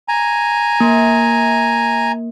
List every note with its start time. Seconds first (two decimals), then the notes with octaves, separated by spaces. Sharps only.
0.08 G#5 A#5
0.80 A#3